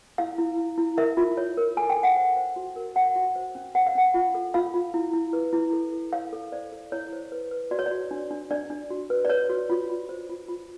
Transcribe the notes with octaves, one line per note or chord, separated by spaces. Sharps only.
E4 F5
E4
E4
E4
A#4 E5
F4
C#5
A#4
A4 G#5
G5
A4
F#5
C5
C5
F#4
A#4
C#5 F#5
F#4
C5
C#4
C5 F#5
F5
C#4 F#5
F4
A4
F4 F5
F4
E4
E4
B4
E4
A4
A4
C#5 F5
A4
C5 D5
A4
E4 C#5
C5
B4
B4
F#4 D5
C#5
D5
F#4
D4
D4
D4 D5
D4
F#4
B4
D5
B4 C#5
F#4
F4
F4
C5
F4
F4